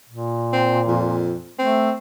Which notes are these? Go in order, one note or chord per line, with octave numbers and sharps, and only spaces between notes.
A#2
C4
F2
A3 C4